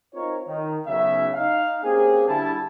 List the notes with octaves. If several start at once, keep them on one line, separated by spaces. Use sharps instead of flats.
C4 D#4 F4 A#4 C#5
D#3
B1 C#3 E5
D#4 F5
A#3 C4 C#4 G4 G#4
D3 G3 E4 A5